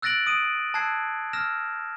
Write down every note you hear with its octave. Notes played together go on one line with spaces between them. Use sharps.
E6 F#6 A6 A#6 D7 F#7
D#6 D7 D#7
A5 E6 F#6 G#6 C7
E6 F6 A#6 E7